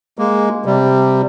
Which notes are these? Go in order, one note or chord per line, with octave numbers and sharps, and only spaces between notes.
G#3 A#3
C3 G3